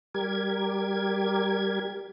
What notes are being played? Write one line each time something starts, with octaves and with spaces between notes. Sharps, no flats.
G3 G4 A#4 G#6